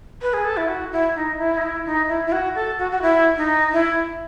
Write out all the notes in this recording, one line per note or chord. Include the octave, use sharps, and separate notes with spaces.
B4
G#4
A4
E4
F#4
E4
D#4
E4
D#4
E4
D#4
E4
E4
F#4
A4
F#4
F#4
E4
D#4
E4